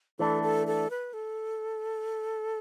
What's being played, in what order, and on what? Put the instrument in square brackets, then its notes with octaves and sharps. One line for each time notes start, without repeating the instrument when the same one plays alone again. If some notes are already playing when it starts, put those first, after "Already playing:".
[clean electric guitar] E3 A3 D4 [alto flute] A4
[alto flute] A4
A4
B4
A4